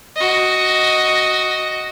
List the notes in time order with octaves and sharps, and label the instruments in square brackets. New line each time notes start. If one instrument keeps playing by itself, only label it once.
[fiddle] F#4 D#5